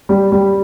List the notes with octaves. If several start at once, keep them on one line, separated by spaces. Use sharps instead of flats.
G3
G3